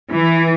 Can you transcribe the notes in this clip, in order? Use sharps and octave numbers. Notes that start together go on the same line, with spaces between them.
E3